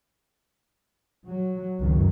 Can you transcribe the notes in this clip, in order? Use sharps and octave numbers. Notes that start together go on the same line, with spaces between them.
F#3
G1 C#2 F#2 D#3 F#3